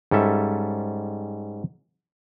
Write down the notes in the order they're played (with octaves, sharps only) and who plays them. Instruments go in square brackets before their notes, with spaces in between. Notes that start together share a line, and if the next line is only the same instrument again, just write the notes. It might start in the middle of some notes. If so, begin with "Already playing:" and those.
[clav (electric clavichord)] G#2 G3 C#4 A4 E5